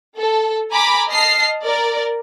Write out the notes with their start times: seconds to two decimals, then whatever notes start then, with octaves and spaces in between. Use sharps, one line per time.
0.16 A4
0.69 G#5 A#5 B5 D6
1.08 D#5 A5 F6 C7
1.63 A#4 D5